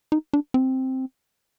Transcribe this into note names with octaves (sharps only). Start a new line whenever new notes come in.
D#4
D4
C4